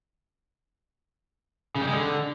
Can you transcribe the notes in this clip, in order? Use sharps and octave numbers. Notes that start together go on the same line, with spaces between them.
C#3
G3
G#3
D3